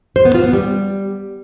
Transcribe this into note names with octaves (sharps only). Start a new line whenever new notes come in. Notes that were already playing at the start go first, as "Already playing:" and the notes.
C5
B3
F4
B3
G3